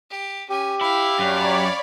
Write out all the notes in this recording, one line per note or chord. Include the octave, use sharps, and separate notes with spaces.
G4
C#4 G4 G#5
E4 F5 G5
F#2 C#5 D5 B5